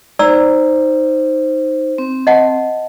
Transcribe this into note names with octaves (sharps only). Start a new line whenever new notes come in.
D#4 C5 D5 A#5 E6
C4
D#5 F#5 A5